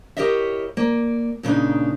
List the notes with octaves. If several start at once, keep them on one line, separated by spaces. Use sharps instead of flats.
E4 G4 A#4 C#5 D#5 E5
A#3 D5
A#2 C#3 C4 D4 D#4